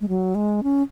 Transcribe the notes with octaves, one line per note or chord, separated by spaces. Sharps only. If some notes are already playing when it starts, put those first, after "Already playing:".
G#3
F#3
G#3
C#4